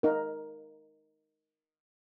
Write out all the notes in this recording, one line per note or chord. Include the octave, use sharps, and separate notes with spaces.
D#4 A#4